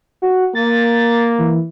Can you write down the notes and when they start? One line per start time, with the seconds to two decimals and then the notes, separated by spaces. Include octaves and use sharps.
0.22 F#4
0.55 A#3 A6
1.39 E3